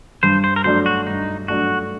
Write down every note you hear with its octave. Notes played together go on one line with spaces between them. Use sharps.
G2 C5
C5
A#4
F#3 A3 D4 C5
F#4
G2 D#4
F#3 A3 D4 F#4